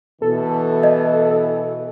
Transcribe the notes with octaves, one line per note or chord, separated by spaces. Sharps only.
B2 E3 A4
D#5